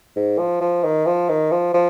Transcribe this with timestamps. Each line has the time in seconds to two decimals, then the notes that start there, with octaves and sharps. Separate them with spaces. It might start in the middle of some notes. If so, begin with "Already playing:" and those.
0.16 G#2
0.38 F3
0.61 F3
0.83 D#3
1.06 F3
1.29 D#3
1.51 F3
1.74 F3